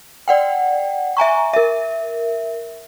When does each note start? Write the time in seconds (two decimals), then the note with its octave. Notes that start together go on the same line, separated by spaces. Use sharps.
0.28 D5 F#5 G5
1.17 E5 G#5 A#5 C#6
1.53 A#4 E5